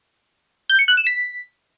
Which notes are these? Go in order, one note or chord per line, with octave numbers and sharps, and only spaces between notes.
G6
C#7
F#6
E7
B6